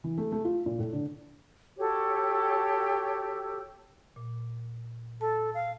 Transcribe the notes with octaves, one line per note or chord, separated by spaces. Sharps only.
E3
A3
A3
F4
A#2
A2
D3
F#4 G4 A4 C#5
A#2
A4 A5
F5